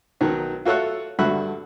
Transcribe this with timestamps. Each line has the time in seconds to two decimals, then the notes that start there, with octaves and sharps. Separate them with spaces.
0.21 B1 D#3 F#3
0.65 F4 F#4 A4 C#5 E5 F#5
1.19 G2 D3 F#4 E5 B5 F#6